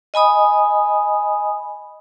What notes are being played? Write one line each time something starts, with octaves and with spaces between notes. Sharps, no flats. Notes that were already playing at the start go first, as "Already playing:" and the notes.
D#5 G#5 B5 D#6